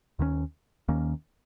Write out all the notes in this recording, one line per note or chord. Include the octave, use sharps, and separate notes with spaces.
D#2 D#3 A#3 C#4
D#2 D#3 A#3 C#4